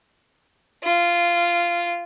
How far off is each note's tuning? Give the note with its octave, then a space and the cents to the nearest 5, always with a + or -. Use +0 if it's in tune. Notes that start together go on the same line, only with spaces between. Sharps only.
F4 -15